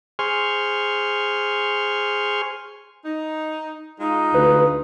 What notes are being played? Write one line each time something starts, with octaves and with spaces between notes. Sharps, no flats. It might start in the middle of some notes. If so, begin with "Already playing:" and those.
G#4 C5 G#5 C6 C#6 F6
D#4
G#3 D#4 F4
D2 B4